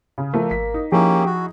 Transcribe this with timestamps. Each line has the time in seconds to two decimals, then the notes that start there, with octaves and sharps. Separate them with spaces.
0.18 C#3
0.34 F3 A3 A#3
0.51 G#1 B6
0.74 D#4
0.92 F3 A#3 C#4 D#4 E4 G4 G#4
1.26 F#4